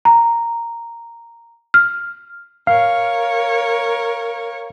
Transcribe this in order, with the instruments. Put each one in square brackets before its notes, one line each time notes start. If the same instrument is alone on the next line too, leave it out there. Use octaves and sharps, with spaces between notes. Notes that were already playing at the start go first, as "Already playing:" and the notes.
[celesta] A#5
F6
[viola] A#4 C#5 [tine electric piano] F5